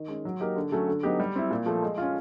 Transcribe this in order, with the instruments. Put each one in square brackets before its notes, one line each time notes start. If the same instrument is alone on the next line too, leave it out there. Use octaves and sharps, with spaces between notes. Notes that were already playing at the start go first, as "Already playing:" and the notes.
Already playing: [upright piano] D#3
G#3 C#4
F#3
A#3 D#4 G4 A#4
D3
F#3 A3 C#4 F#4
D3
F#3 B3 D#4 G4
G3
C4 E4
A#2
F3 A3
G#3
C#4 F4